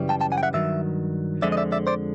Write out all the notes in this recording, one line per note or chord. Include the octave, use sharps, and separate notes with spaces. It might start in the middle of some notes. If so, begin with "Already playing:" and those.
Already playing: F#2 C#3 E3 G3
G5 A5
G5 A5
F#5 G#5
G5
E5 F#5
G2 D#3 F#3 E5
F2 D3 F3 G#3 D5 E5
D#5
D5 E5
D5 E5
C5 D5